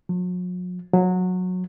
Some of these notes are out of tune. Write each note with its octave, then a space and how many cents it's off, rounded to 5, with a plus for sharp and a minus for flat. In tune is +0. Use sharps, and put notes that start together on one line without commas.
F#3 -45
F#3 -20